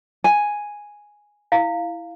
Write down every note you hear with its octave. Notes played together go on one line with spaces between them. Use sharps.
G#5
E4 F5